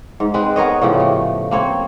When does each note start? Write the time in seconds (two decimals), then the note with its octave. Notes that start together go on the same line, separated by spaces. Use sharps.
0.20 G#2
0.34 G#3 C4 B4
0.56 B3 A#4 C#5 D#5
0.82 A2 C#3 F3 G4
1.00 A3
1.51 A#3 C4 C#5